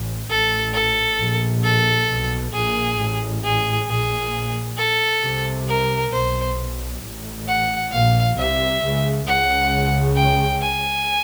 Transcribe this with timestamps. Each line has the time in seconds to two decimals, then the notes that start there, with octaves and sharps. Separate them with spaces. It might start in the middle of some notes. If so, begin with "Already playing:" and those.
Already playing: A1 A2
0.30 A1 A2 A4
0.74 A4
1.19 A#1 A#2
1.64 A4
2.08 B1 B2
2.53 A#1 A#2 G#4
2.98 A1 A2
3.44 G#4
3.88 A#1 A#2 G#4
4.78 A4
5.22 C2 C3
5.68 A#4
6.12 B1 B2 C5
7.03 A1 A2
7.48 F#5
7.92 A#1 A#2 F5
8.36 C2 C3 E5
8.81 C#2 C#3
9.26 C#2 C#3 F#5
10.16 G5
10.62 G#5